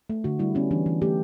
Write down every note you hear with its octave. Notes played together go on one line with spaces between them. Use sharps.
A3
D3 F#4
G3 E4
B3 C#4
E3 D4
E3
A3 G4